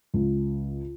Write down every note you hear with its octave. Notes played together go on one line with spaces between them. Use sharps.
C#2